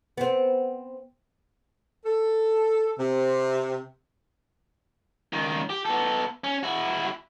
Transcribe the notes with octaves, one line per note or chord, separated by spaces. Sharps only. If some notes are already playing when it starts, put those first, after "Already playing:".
B3 C4
A4
C3
C#2 D#3
G4
B3 A4
C#4
E4 F#4